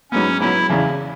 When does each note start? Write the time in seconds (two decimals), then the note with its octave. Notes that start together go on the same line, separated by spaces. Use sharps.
0.11 G#2 F#3 B3 C#4
0.40 G#2 F#3 B3 E4
0.70 E2 C#3 E3